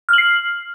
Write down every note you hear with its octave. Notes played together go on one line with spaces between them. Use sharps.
F6 C7 F#7